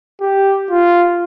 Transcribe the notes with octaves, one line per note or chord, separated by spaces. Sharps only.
G4
F4